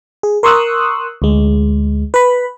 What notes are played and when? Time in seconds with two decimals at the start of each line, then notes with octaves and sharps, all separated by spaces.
0.23 G#4
0.43 A#4 C6 C#6 D#6 E6 F#6
1.22 D2 G#3
2.14 B4 B5